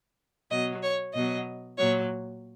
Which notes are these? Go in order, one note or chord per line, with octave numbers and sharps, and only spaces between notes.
B2 F#3 D#5
C#5
B2 F#3 D#5
A#2 F#3 C#5